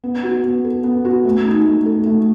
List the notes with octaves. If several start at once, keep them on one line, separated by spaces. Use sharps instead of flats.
B3
F#4
B3
A4
B3
F#4
A3
D#4
A3
A4
A3